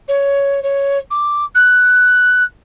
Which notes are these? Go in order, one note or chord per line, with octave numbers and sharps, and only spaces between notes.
C#5
C#5
D6
F#6